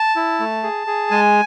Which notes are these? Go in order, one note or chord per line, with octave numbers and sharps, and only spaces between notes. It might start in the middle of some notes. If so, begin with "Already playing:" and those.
Already playing: A5
E4
A3
G#4
G#4
G#3 G#5